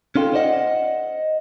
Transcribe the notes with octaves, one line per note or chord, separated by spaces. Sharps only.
C#4 D#4 F4 A4 G5
C5 D5 D#5 F#5